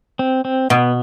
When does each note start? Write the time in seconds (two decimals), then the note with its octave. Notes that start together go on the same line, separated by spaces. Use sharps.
0.19 C4
0.45 C4
0.70 B2 B3